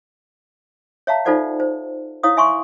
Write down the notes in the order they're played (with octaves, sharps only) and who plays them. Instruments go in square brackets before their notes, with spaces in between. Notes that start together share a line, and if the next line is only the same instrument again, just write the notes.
[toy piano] C#5 E5 F5 A5 A#5
D#4 F4 A4 C5 D5 F#5
C5
E4 C#5 F5 D#6
E5 G#5 C6 C#6